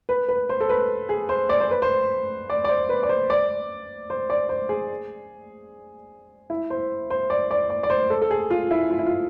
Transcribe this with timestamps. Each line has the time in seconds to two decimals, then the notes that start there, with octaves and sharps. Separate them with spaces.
0.09 B4
0.29 B4
0.49 C5
0.60 A4
0.69 B4
1.09 G#4
1.29 C5
1.49 D5
1.60 C5
1.71 B4
1.82 C5
2.50 D5
2.64 D5
2.69 C5
2.89 B4
3.03 D5
3.09 C5
3.30 D5
4.10 C5
4.30 D5
4.49 C5
4.69 G#4
6.50 E4
6.70 C5
7.10 C5
7.30 D5
7.51 D5
7.70 D5
7.83 D5
7.90 C5
8.10 A4
8.22 A4
8.31 G#4
8.50 F4
8.71 E4
8.90 F4
8.99 E4
9.06 F4